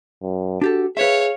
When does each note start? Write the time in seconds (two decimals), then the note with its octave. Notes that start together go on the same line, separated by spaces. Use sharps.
0.22 F#2
0.62 D4 F#4 G4 A4
0.97 G#4 B4 C#5 E5 F5